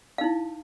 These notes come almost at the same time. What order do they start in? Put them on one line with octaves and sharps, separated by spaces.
F5 D#4 E4